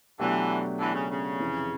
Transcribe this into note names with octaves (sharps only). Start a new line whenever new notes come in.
B2 D3 E3 F#3 A3 D4 G4
D3 E3
C#3
C#3
F2 C3 E3